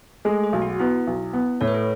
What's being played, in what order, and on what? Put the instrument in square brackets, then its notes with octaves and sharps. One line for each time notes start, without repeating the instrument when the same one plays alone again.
[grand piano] G#3 [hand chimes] A3 A4
[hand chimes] G#4
[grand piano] B1
[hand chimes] F#4
[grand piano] B3 [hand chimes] E4
[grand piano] B1
B3
[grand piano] A2 [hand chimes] C#5
[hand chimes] B4
A4